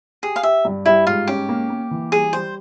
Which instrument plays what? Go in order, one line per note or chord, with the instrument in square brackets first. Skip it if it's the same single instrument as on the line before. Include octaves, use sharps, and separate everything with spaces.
[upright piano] G4 [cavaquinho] G#4
[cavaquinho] F5
[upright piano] G4 [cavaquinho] E5
[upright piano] G2
[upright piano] G3 [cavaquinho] E4
[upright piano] G#2 [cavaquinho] F4
[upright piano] C#4 [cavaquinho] G4
[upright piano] A#3
A#3
E3
[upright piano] G3 [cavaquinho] G#4
[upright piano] G3 [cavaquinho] C5